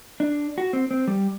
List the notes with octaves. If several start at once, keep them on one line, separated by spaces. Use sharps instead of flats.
D4
F#4
C4
C4
G3